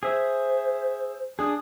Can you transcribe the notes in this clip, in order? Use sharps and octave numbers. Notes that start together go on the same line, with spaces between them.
G#4 C5 E5
D4 G#4 D#6